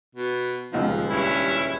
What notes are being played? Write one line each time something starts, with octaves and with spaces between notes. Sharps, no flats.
B2
D#1 C#2 F3 D#4
G2 C#4 E4